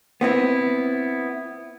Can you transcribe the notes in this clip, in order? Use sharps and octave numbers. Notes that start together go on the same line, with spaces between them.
B3 C4 E4